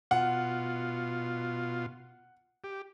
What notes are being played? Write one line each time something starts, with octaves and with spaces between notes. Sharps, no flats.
B2 F4 F#5
G4